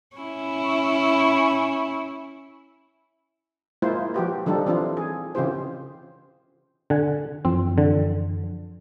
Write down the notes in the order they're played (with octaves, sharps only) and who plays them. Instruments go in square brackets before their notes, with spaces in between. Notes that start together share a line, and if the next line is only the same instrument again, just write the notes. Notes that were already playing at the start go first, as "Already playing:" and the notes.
[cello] C#4 E4
[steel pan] G#3 A#3 E4 F4 C5
F3 F#4 G4 B4
D#3 F3 G3 D4 D#4 A4
E3 F3 C4 D4 E4 F4
G#4
C#3 E3 C4 F4 G4 C5
[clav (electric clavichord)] D3 F#5 G#5
[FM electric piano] F#2 E3 F3 [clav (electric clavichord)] C4
[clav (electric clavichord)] D3